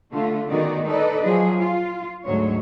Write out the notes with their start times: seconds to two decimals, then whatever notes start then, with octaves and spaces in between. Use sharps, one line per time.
0.13 D3 A3 F4
0.48 D#3 G#3 B3 D#4 F#4 D5
0.85 D#4 A4 B4 D5 D#5
1.26 F3 F#3 G#4
1.60 F4
2.26 D2 G#2 F#3 C#5